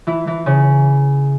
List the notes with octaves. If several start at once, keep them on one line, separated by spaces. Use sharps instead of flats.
E3 E4
E3
C#3